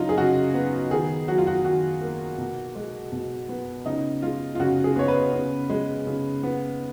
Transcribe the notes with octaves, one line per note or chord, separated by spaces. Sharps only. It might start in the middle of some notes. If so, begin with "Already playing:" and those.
Already playing: C#3 F#3 D#4 F4
G#4
C#3 F#4
B3
D#3 G#4
F#3 F#4
F4
F#4
D#3 F#4
A#3
B2
G#3
B2
B3
C#3 D#4
G#3 F4
F4
C#3 F#4
G#4
B3 C#5
B4
C#3
G#3
C#3
B3